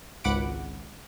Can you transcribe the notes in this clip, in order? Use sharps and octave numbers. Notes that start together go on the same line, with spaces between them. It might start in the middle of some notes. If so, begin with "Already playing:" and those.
G#1 C#2 F#5 B5 D6 D7